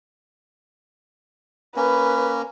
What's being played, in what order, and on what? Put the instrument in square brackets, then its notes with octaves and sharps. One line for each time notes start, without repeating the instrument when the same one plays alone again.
[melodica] A#3 C#4 [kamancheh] B4